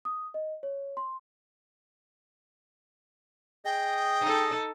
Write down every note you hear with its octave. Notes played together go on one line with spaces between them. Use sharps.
D#6
D#5
C#5
C6
G#4 D#5 G5
D#4 A4